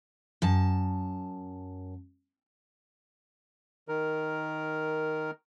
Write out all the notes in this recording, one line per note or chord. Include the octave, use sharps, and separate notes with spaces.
F#2 A5
D#3 A#4